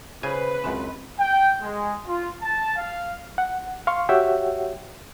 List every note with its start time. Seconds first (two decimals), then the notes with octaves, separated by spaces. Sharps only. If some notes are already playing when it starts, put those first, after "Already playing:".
0.23 C#3 B4 C5 G#5
0.64 C#2 F#2 C#3 C4
1.18 G5
1.61 G#3
2.06 F4
2.40 A5
2.76 F5
3.38 F#5
3.87 F5 C6 C#6
4.09 F#4 G4 C#5 E5 F#5 G5